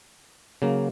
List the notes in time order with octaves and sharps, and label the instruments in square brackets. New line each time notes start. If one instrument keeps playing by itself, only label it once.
[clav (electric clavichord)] C#3 F#3 A#3